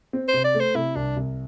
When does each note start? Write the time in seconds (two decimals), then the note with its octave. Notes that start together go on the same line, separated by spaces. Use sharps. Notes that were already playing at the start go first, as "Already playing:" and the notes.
0.13 C4
0.28 C5
0.34 C3
0.44 D5
0.55 A3
0.60 C5
0.75 C3 E4
0.96 C2 D4
1.16 C2